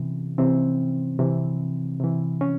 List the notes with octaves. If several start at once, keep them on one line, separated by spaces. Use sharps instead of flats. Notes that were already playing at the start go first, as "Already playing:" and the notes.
Already playing: C3 E3
C3 E3 C4
C3 E3
C3 E3
C#4